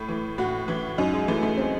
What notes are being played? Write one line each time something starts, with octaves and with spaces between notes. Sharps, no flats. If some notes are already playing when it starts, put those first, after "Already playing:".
Already playing: A2
E3
A2 F#4
E3 E4
F#2 D#4
G#3
E3 A3
A3
C4